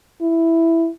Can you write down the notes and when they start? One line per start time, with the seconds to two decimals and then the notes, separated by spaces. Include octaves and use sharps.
0.22 E4